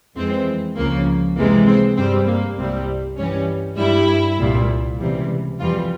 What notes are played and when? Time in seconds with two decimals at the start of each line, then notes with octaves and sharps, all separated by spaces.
0.15 F2 E3 G#3 C4
0.76 C#2 C#3 F3 A#3
1.36 F2 C3 E3 G#3 A#3
1.67 C4
1.96 G2 G3 C4
2.27 A#3
2.57 C2 C3 G3 C4
3.17 G2 E3 G3 C#4
3.77 G2 G3 E4
4.37 C2 A#2 G3
4.99 C#2 C3 E3 G3
5.58 F2 E3 G3 F4